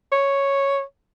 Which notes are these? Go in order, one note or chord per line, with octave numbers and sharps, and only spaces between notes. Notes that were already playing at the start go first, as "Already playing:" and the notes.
C#5